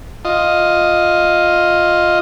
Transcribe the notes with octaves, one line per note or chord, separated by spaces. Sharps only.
F4 D#5